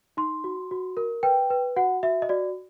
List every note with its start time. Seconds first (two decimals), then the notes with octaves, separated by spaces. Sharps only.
0.17 D#4 C6
0.44 F#4
0.71 F#4
0.97 A#4
1.23 B4 G5
1.50 B4
1.76 F#4 F#5
2.03 F#4 E5
2.22 D#5
2.29 F#4 D5